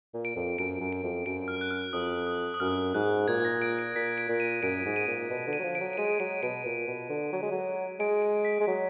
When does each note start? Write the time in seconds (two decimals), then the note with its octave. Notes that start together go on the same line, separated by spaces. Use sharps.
0.14 A#2
0.25 D7
0.36 F2
0.59 F#2 D7
0.80 F#2
0.93 D7
1.03 F2
1.26 F#2 D7
1.48 F6
1.61 F#6
1.71 F6
1.93 F2 D#6
2.27 D#6
2.54 D#6
2.60 F#2 F6
2.94 G#2 F#6
3.28 A#2 G#6
3.40 G#6
3.45 A#6
3.62 D7
3.79 D7
3.95 A#2 B6
4.18 D7
4.29 A#2
4.40 D#7
4.63 F#2 D7
4.85 G#2
4.96 D#7
5.08 A#2
5.30 B2
5.47 D3
5.53 D#7
5.59 F#3
5.64 F3
5.75 D7
5.80 F#3
5.93 D7
5.97 G#3 D#7
6.20 F#3 D7
6.43 B2 D7
6.65 A#2
6.87 B2
7.10 D3
7.32 F#3
7.42 G#3
7.51 F#3
8.00 G#3 D7
8.22 D7
8.45 B6
8.61 G#3
8.67 F#3